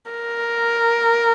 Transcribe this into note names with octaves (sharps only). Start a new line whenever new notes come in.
A#4